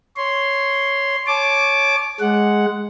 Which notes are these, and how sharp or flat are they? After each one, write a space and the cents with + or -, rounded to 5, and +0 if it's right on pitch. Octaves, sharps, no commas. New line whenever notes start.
C#5 +0 C6 +0
C#5 +0 A5 -35 D6 +0
G#3 +0 F#5 +0